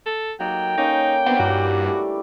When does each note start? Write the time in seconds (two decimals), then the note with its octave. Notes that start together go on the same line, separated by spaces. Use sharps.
0.06 A4
0.40 F#3 A#3 D#4 A4 G5
0.78 A#3 C#4 D#4
1.26 F#3 B3 C4 D4
1.40 G2 E3 F#4 G4 A#4
1.84 G3 A3